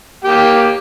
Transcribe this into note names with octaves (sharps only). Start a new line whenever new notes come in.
A#3 G4 G5